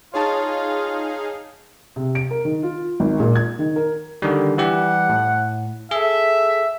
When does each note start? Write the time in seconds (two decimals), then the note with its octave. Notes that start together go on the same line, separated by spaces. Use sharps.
0.14 D#4 F4 G#4 C#5 F5 A5
1.96 C3
2.15 D7
2.31 A#4
2.45 D#3
2.63 F4
3.00 G#1
3.20 A#2
3.36 G#6
3.59 D#3
3.76 A#4
4.22 D3 D#3 G3
4.58 E3 G3 G4 F#5
5.09 A2
5.91 G#4 A4 E5